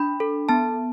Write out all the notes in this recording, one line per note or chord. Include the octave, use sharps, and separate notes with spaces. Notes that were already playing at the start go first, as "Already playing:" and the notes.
Already playing: D4 B5
A4
B3 A5